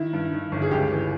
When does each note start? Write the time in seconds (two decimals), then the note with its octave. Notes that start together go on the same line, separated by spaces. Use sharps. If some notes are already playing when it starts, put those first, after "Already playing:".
Already playing: D#3 E4
0.13 G2
0.33 D#3
0.52 G1
0.62 G#4
0.71 C#2 G4
0.92 E3